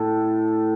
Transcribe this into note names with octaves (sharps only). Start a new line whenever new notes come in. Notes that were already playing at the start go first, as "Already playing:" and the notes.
Already playing: A2 A4